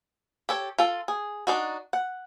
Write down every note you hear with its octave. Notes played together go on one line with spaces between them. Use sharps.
G4 A4 C#5
F4 A4
G#4
D4 D#4 F#4
F#5